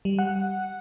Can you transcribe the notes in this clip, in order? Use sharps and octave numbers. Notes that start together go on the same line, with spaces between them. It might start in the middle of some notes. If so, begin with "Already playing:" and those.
G3
F#5